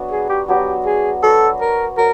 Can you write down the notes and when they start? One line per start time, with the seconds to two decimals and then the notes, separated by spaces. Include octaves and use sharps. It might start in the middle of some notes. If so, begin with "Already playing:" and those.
Already playing: F#3 B3 D4 F#4
0.11 G#4
0.29 G4
0.48 F#3 B3 D4 F#4 G4
0.85 G#4
1.23 F#3 B3 D4 F#4 A4
1.61 A#4
1.97 F#3 A#4